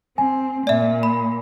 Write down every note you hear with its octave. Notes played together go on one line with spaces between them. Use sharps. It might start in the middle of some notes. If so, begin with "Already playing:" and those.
C4 G#5
A#2 D5 E5
B5